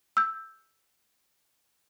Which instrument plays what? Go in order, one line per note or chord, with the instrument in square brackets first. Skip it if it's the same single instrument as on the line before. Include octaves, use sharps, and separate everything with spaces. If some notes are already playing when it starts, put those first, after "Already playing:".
[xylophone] E6 G6